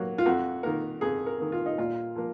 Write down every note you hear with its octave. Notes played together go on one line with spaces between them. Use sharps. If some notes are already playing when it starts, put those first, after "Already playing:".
Already playing: F#3 A#3
F4
F2 F#4
D#3 A#3 A#4
F2 G#4
A#4
D#3 A#3
F4
D#4
A#2 F4
F3 A#3